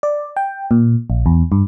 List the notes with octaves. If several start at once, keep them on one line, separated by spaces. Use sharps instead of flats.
D5
G5
A#2
A#1
E2
G2